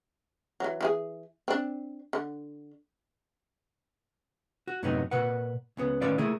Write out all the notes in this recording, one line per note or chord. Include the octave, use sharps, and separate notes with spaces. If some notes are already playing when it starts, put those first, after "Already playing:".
E3 F#3
E3 E4 G#4
C4 D4
D3
F#4
F#2 A2 C3 F#3 B3 D#4
A#2 B4 F#5
C#2 C#3 B3
A2 D#3 C#4 B4 D5 F5
A3 A#3 E4 G#4